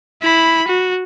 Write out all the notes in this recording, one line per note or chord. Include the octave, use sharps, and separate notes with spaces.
E4 B5
F#4